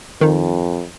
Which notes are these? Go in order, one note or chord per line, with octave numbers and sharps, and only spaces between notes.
F2 D#3 D#4